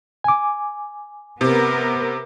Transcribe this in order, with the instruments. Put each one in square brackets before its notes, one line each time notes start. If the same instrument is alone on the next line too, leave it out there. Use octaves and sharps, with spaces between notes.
[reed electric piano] G#5 D6
[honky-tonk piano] C3 [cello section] B3 A#4